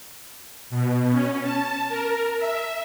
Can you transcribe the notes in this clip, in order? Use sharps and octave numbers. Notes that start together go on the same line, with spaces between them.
B2
C#4
A5
A#4
E5